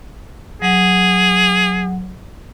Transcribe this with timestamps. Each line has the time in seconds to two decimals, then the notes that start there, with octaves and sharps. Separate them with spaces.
0.62 F#3 G#4 F#5